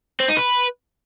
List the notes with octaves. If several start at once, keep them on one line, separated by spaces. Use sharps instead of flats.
C4
D#4
B4